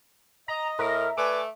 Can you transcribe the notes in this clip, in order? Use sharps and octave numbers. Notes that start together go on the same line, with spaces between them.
D#5 A#5
A2 A#4 E5
A3 B4 D5 G#5 D6